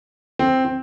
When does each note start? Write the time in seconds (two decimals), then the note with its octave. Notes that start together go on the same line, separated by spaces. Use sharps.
0.39 C4
0.65 C4